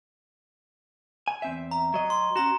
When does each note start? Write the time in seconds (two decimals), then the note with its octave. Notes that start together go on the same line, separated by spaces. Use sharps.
1.28 G#5
1.42 E2 C4 E5
1.71 A#5
1.94 F#3 D#5
2.10 C6
2.36 C#4 F#4 A#5 E7